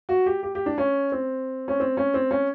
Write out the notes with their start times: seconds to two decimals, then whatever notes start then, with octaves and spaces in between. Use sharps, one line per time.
0.09 F#4
0.26 G4
0.43 G4
0.55 G4
0.66 D4
0.78 C#4
1.12 C4
1.68 C#4
1.80 C4
1.97 C#4
2.14 C4
2.31 C#4